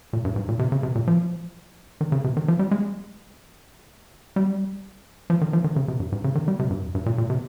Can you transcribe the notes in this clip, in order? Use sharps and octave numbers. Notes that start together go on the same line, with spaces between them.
A#2
G2
G#2
A#2
C3
C#3
C3
A#2
F3
D#3
C#3
C3
D#3
F3
G3
G#3
G3
F3
D#3
F3
D#3
C#3
C3
G2
G#2
C#3
D#3
G3
C3
G2
F2
G2
A#2
A#2
C3